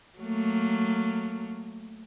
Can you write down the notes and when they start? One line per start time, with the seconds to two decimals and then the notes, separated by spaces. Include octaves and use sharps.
0.19 F#3 A3 A#3